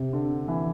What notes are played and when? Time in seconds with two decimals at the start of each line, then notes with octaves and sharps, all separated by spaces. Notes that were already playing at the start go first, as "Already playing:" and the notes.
Already playing: C3
0.13 D3
0.48 E3